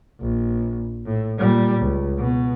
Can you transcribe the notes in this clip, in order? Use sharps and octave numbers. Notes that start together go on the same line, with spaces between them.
A#1
A2
A#2 G3
C#2
B2